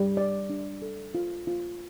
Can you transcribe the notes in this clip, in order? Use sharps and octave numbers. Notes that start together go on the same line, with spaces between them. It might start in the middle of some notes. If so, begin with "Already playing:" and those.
Already playing: G3
D5
D4
A4
F4
F4